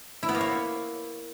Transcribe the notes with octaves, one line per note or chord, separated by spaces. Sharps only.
E4
B3
A#3
C#5